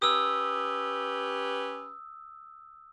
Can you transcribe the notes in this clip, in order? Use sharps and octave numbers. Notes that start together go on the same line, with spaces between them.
C#4 G4 B4 D#6 E6